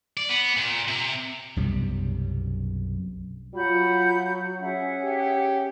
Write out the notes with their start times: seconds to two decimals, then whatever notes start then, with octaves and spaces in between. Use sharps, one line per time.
0.17 D5
0.29 B3
0.57 A#2
0.88 C3
1.57 B1 F#2 C3 G3
3.55 F#3 F4 F#5 B5 G6
4.60 C#4 G#4 E5 F#5
5.04 G4